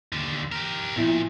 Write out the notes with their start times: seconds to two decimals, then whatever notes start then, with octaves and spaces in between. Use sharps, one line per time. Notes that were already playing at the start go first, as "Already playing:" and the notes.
0.12 D#2 D3
0.52 G4 A#4
0.96 A#2 F3 B3 E4 E5